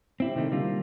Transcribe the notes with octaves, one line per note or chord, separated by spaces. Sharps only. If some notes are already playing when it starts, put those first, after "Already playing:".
C4 E4 G4
C3 D#3 A3 C4 D4 D#4
D3 G3 A#3 F4